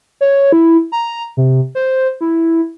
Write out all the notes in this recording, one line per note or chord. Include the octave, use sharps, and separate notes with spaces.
C#5
E4
A#5
C3
C5
E4